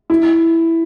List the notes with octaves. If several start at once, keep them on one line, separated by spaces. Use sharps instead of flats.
E4